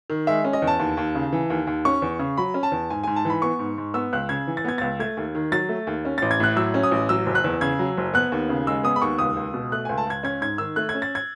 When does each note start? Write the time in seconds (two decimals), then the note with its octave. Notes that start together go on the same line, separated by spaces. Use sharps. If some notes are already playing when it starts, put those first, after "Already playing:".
0.10 D#3
0.27 G#3 E5
0.45 C#4
0.53 D#5
0.62 E2
0.67 A5
0.79 D#2
0.97 D#2
1.15 C#3
1.33 E3
1.50 D#2
1.67 D#2
1.85 C#4 C#6
2.02 E2
2.19 C#3
2.37 F#3 B5
2.54 C#4
2.63 A5
2.72 E2
2.90 G#2 G#5
3.04 G#2 G#5
3.16 A5
3.25 E3 B5
3.42 B3 C#6
3.59 G#2
3.78 G#2
3.94 B3 E6
4.13 C#2 F#6
4.29 C#3 G#6
4.47 E3
4.57 A6
4.65 B3 G#6
4.78 C#2 A6
4.99 A3 G#6
5.17 D#2
5.35 D#3
5.52 F#3 A6
5.69 A3
5.87 D#2
6.05 C#4
6.18 A1 A6
6.31 G#6
6.40 A2 F#6
6.56 F#3 E6
6.74 C#4
6.83 D#6
6.92 A1
7.09 F#3 E6
7.26 F#1
7.35 F#6
7.44 E2
7.61 C#3 G#6
7.79 F#3
7.97 F#1
8.14 B3 F#6
8.32 D#2
8.49 C#3
8.67 G#3 E6
8.84 B3 D#6
8.96 B5
9.02 D#2 C#6
9.18 C#2 D#6
9.37 C#2
9.54 B2
9.72 A3 F#6
9.85 C#2 G#5
9.98 A5
10.07 C#2 G#6
10.23 C#4 G#6
10.41 G#2 G#6
10.58 D#3 E6
10.76 A3 F#6
10.89 G#6
10.94 C#4
11.02 A6
11.15 G#6